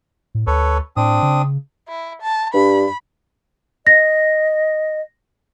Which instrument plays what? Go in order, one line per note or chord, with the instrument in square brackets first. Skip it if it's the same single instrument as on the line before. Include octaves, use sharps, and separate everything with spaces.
[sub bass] A2
[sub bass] D2 [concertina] A4 B4 C#5
[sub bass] A2 [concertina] C4 D4 D#6
[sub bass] C#3
[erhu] E4
A5
[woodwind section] G2 [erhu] B5
[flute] D#5 [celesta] A#6